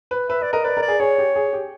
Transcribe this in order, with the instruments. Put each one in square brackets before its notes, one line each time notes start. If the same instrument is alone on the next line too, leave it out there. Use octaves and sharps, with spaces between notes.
[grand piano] B4
[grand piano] B4 [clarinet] E5
[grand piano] B4 [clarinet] D5
[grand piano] A#4 [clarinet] D#5
[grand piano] B4 [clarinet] D5
[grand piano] A#4
[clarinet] D5
[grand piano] G#4
[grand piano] G#4 [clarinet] C#5
[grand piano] G4
G#4
G4